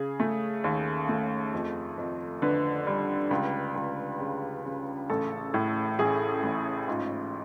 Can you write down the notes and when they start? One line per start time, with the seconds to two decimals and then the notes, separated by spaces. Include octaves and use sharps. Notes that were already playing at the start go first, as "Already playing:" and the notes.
Already playing: C#3 G#4
0.20 A3
0.64 D#2
1.09 A3
1.53 F2
1.98 F2
2.42 D3 B4
2.87 G3
3.31 C#2
3.76 C#2
4.20 C#3
4.65 C#3
5.09 A1 A4
5.54 A2
5.99 A1 G#4
6.43 A1
6.88 G#2 F4